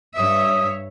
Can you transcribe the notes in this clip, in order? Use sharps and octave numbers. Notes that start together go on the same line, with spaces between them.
G2 C#5 E5 D#6